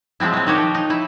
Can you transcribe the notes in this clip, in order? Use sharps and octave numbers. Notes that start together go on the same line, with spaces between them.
F3 F#3 G#3 C4 E4
F#3 C4
D#3 F#4 G4 C#5
F3
D#4
E4